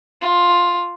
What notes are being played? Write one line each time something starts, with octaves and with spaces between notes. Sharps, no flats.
F4